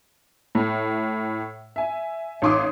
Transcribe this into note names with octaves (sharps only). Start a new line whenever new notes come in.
A2
E5 G#5
A1 D#4 F5 C6 D6 D#6